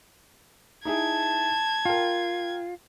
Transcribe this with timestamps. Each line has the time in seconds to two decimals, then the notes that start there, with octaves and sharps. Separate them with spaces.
0.85 D#4 E4 G#4 A5 G#6
1.85 F4 A#4 G5